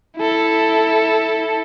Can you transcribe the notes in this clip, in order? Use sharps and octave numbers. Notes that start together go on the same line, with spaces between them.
E4 A4